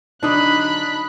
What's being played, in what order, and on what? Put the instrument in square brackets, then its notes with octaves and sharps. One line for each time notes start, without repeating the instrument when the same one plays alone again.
[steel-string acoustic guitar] D3 F#3 D#4 [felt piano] D4 D#6 [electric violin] B5 F#6